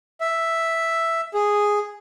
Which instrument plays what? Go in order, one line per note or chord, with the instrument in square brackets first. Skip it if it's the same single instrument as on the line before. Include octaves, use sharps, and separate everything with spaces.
[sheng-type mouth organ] E5
G#4